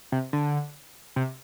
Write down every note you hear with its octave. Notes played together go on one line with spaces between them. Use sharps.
C3
D3
C3